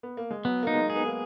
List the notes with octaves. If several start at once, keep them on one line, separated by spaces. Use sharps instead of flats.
B3
A#3
G#3
F#3 B3
A#3 D#4
G#3
G#4
B3
A#3